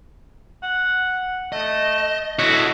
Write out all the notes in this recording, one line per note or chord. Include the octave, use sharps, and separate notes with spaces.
F#5
A3 D#5
E4 F#4 A4 C#5 D#5